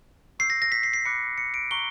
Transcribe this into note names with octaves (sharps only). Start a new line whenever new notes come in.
C#6 E6 G6 C7
A#6
A#6
B6
C7
C7
B5 D6 F#6 C#7
C#7
D7
A#5 C#6 F#6 G7